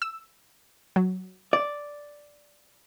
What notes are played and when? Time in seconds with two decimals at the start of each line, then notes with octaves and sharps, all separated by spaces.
0.02 E6
0.96 F#3
1.53 D5